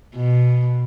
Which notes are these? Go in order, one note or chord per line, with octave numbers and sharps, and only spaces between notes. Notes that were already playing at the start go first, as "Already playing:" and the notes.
B2